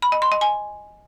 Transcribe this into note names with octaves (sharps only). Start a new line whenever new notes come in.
B5
D#5
C6
D#5
G#5